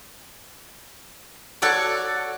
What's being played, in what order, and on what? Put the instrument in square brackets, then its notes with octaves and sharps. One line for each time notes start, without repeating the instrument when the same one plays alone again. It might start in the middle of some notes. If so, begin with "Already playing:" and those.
[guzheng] F#4 A4 C#5 D5